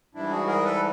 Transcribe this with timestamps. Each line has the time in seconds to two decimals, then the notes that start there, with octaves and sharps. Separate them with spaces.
0.15 G#2 E3 G3 D4 E4
0.30 F#4 G#4
0.47 G#4 A#4
0.64 A4 B4